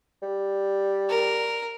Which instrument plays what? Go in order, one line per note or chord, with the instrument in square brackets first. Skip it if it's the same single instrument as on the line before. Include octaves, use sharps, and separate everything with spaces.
[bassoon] G3
[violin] A#4